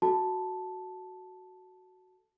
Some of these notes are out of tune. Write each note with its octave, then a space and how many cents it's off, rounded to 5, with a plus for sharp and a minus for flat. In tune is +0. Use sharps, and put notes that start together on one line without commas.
F#4 +0 A4 +0 A5 -5